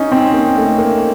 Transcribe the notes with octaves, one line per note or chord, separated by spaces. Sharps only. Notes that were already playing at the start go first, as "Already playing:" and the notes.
Already playing: C#4 D#4
C4
A#3
A3
A#3